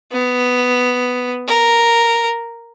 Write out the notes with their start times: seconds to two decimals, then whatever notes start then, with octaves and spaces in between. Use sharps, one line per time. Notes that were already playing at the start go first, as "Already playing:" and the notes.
0.12 B3
1.48 A#4